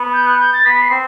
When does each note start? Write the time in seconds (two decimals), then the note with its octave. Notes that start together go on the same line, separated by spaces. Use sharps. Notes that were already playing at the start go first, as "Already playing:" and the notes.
Already playing: B3
0.14 G6
0.26 F#6
0.40 G6
0.53 A6
0.65 B3 B6
0.82 C7
0.91 C4